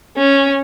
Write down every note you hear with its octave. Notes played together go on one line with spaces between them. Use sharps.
C#4